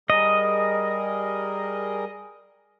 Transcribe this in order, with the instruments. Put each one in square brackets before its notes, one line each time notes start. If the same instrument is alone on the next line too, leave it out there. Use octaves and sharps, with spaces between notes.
[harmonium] G3 G#4 A#4 [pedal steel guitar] D#5